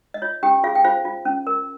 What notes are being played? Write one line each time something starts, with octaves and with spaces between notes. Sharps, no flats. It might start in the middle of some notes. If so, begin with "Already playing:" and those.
D#5
F4 C#5
C#4 G4 G5
F4 G#4 F5
G5
F4 C5 F5
F4
C#4
A#4